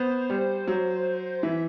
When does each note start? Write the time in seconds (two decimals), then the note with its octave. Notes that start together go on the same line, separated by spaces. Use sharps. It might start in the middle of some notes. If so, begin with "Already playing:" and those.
Already playing: B3 C5
0.30 G3
0.67 F#3
1.43 E3 E5